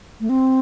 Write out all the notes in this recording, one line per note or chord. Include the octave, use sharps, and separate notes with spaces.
A3
C4